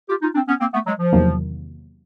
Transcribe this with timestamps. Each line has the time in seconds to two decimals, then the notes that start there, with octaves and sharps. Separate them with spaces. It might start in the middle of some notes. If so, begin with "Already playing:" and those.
0.09 F4 G4
0.22 D#4 F4
0.35 C4 D4
0.48 B3 C#4
0.61 A#3 C4
0.74 A3 B3
0.86 F#3 G#3
0.99 F3
1.12 E2 C3 D#3 F#3 A#3